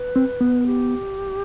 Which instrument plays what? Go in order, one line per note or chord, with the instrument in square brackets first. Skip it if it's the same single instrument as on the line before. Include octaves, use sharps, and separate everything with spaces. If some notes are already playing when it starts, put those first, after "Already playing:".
Already playing: [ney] B4
[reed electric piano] C4
B3
[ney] G4